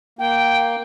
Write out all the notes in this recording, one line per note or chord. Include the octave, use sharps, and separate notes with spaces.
A#3 G5